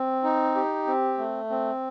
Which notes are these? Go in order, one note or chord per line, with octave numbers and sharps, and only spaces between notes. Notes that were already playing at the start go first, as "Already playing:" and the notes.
Already playing: C4
D#4
G4
C4
A3
C4